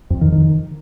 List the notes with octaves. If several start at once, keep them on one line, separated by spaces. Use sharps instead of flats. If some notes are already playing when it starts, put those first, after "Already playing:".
F2
D#3
D#3